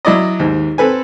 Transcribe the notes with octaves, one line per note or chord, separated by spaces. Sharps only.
F#3 E4 D5 D#5
D#2 G#2
C4 A4 B4 G#5